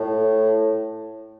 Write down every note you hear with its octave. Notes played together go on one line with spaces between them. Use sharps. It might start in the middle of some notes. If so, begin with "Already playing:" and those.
Already playing: A2